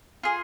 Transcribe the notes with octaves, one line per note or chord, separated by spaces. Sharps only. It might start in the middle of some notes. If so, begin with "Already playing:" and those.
F4 G#4